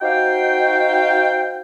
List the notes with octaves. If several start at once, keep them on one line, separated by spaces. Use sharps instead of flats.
D#4 F#4 C5 F5 G5